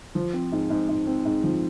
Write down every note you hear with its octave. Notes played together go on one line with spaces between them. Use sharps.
F3
C4
G#2
G#2
G#2
C4
G#2
F3